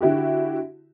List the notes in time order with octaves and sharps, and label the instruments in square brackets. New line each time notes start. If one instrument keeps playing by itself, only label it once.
[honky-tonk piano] D3 E4 F#4 G4